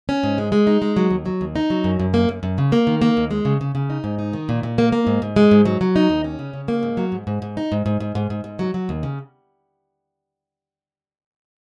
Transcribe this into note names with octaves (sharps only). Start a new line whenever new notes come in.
C#4
G#2
G#3
G#3
D#4
G#3
F#3
D#2
F#3
D#2
D#4
F#3
F#2
F#2
A#3
F#2
F#2
C#3
A#3
D#3
A#3
D#2
G#3
C#3
C#3
C#3
D#4
G#2
D#4
D#3
A#2
A#2
A#3
A#3
G#2
G#2
G#3
G#2
F#3
F#3
D#4
D#2
C#4
C#3
C#3
A#3
G#2
F#3
G#2
G#2
G#2
D#4
G#2
G#2
G#2
G#2
G#2
G#2
F#3
F#3
D#2
C#3